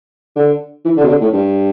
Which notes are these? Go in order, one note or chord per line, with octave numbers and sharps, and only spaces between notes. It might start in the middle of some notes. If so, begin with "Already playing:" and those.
D3
E3
D3
B2
D3
A2
G2